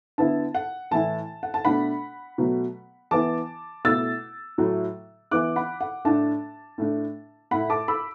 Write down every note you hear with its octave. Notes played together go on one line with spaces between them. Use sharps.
D3 B3 E4 A5
F#5
A2 E3 A3 E4 A5
F#5
A5
B2 A3 D4 F#5 B5
B2 F#3 A3
E3 B3 E4 A5 D6
B2 A3 E4 E6 A6
A2 F#3 A3 E4
E3 B3 E4 D6 F#6
F#5 B5
F#5
A2 A3 D4 A5
A2 A3 D4
A2 A3 E4 F#5 B5
A5 D6
B5 E6